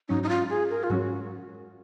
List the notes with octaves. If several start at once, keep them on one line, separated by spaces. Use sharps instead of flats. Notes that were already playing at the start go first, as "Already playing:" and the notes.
G#2 F#3 C#4 D#4
D#4
F4
G#4
A#4
F4
G#2 F#3 C#4 F#4